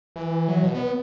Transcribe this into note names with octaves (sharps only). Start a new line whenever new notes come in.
E3
F#3
B2
B3